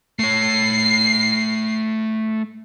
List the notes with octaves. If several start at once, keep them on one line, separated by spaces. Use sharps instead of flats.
A3 C#5 C7